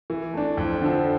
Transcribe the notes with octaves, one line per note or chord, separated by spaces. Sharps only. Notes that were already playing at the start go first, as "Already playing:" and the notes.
E3
A3 D4
F2
D3 F3